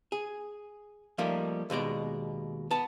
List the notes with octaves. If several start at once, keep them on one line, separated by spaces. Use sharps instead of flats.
G#4
F3 G3 A3 A#3 D#4
D#2 B2 G#3 D5
B3 A5